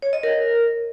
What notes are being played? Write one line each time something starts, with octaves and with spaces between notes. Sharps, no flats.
C#5
D#5
A#4